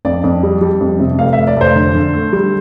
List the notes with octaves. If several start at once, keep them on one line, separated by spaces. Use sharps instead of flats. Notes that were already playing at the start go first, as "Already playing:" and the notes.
F2 D5
F2
G3
G3
F2
C3
F1 F5
F1 E5
D5
F1 C5
D3
D3
A3
G3